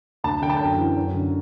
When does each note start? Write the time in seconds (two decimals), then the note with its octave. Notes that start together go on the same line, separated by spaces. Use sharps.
0.24 D2 A5
0.42 D3 G5
0.50 A5
0.57 F#2 G5
0.78 E3
0.97 F#2
1.14 D3